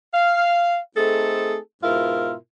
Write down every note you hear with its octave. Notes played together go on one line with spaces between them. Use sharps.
F5
A3 C4 D#4 G#4 A4
G#2 B2 E4 F4 A#4